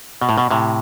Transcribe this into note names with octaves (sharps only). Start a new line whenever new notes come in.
B2
A2
B2
A2 C3